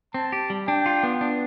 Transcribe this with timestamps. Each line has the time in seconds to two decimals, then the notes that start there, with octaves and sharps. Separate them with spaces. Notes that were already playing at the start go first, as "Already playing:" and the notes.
0.14 C4 A5
0.32 G4
0.50 G3
0.68 D4 G5
0.86 F4
1.03 B3
1.21 D4